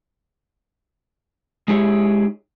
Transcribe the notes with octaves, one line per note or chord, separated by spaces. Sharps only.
G#3 D#4 E4 G4 G#4 C#5